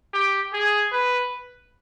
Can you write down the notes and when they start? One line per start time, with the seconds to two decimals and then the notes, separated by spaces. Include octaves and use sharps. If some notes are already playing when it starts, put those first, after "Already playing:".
0.13 G4
0.53 G#4
0.92 B4